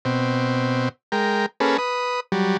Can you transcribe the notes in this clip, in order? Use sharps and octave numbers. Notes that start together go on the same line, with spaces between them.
B2 C4
G#3 A#4 G5
A#3 C#4 G#4 A4 B4
B4 D#6
F#3 G3